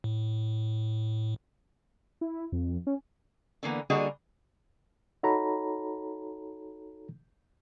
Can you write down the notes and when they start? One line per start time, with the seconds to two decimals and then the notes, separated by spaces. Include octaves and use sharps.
0.04 A2
2.21 E4
2.52 F2
2.87 C#4
3.63 D3 E3 A#3 B3
3.90 D3 G3 A#3 F#4 G#4 D#5
5.23 D#4 F#4 A4 C#5 A#5 B5